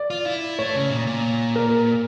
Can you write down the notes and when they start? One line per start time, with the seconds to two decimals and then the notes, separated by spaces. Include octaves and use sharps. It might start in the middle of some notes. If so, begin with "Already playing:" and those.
Already playing: D5
0.10 F4
0.26 E4
0.59 A3 C#5
0.75 C#3
0.90 A#2
1.07 A#2
1.56 A#4